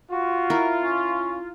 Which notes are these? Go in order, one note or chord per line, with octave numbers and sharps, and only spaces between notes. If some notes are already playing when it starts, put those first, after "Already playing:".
F4 F#4
E4 A#4
C#4